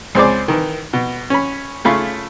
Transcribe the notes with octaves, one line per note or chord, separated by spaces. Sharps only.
C#2 C4 G#4 C5 D5 D6
D#3 E3
B2
C#4 B5
C#3 A3 F4 B5 C#6